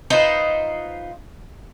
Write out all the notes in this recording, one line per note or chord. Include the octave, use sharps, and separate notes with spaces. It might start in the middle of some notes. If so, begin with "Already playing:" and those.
D#4 F4 B4 C5